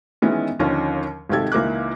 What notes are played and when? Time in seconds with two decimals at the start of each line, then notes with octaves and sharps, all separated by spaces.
0.22 D#3 E3 G#3 B3 C#4
0.60 D#2 D3 D#3 F3 C#4
1.29 G#1 C3 D#3 G4 A4 G#6
1.52 C#2 E3 A#3 D#4 D6 F#6